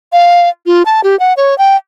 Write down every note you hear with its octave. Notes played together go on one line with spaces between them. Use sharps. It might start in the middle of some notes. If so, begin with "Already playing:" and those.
F5
F4
A5
G4
F#5
C#5
G5